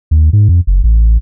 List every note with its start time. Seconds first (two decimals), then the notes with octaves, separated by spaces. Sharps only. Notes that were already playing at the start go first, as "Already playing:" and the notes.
0.11 D#2
0.33 G#2
0.49 F2
0.67 F#1
0.84 A1